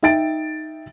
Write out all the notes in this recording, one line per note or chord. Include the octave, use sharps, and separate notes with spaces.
D#4 E5 G5 A6 D7